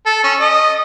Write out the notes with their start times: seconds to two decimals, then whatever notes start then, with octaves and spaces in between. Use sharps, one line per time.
0.06 A4
0.23 C#4
0.40 D#5